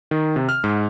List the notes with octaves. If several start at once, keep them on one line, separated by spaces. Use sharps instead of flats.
D#3
C3
F6
G#2